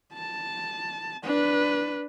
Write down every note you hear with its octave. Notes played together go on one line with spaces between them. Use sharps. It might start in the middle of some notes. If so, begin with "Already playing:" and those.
A5
D4 B4